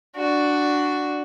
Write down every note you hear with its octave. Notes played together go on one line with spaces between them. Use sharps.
D4 F#4